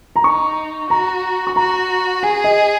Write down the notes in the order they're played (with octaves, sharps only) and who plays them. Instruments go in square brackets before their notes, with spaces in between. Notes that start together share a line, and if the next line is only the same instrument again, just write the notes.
[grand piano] A#5
[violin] D#4 [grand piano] C#6
[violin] F#4 [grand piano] A#5
[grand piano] C#6
[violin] F#4 [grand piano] A#5
[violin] G#4 [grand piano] G#5
[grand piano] D#5